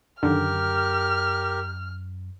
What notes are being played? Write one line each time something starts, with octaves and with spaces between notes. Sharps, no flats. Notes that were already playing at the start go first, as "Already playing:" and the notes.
F#2 D3 D#3 G4 A#4 F6